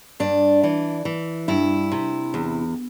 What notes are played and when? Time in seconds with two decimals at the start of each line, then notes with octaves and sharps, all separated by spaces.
0.20 G2 D4
0.63 E3
1.05 E3
1.48 G2 E4
1.92 C3
2.34 E2